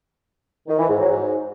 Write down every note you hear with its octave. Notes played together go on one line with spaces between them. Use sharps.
D#3
E3
G#2
F#3
G#2